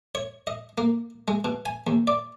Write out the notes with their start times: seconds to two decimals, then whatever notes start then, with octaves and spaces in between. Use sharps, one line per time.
0.15 C#5
0.47 D#5
0.78 A#3
1.28 G#3
1.45 B2
1.66 G#5
1.87 D#2
2.07 D5